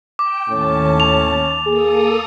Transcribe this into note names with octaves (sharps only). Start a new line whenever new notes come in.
G5 D6
D#2 A2 C#4 A5
F7
A#3 G#4 A4 D#6